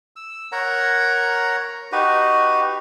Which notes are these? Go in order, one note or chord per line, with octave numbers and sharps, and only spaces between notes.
E6
A#4 C#5 F#5 A#5
D#4 F#4 G4 B4